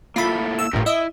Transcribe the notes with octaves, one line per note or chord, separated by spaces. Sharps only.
A#3 E4 F4 A4 B5
E6
G1 A2 F4 G4 A#4
E4 D#5 E5